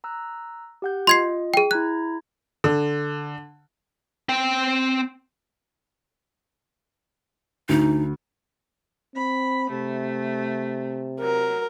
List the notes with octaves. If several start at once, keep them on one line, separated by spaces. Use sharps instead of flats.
A#5 E6 F#6
G4 F#5 G6
F4 D#5 C6 G#6 C7
G#4 G5
E4 A#5 F#6 G#6
D3
C4 G5
D2 D#4
C4 B5
C3 A3
F#3 A#4